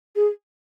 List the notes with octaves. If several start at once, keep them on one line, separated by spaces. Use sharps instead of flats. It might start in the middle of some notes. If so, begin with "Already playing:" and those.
G#4